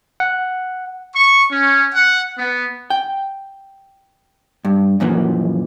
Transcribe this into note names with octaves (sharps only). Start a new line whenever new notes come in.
F#5
C#6
C#4
F#5
B3
G5
G2
F#2 A#2 E3 F3